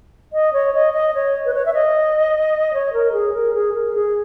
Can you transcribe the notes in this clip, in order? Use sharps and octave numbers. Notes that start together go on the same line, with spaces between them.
D#5
C#5
D#5
D#5
C#5
B4
C#5
E5
D#5
C#5
A#4
G#4
A#4
G#4
A#4
G#4